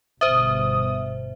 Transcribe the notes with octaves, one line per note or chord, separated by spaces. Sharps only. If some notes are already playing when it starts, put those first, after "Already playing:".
G1 B2 C5 E5 D#6